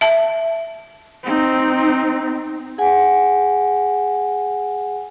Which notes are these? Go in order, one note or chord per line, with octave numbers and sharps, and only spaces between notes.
E5 A5
C4 D#4
G#4 F#5 G#5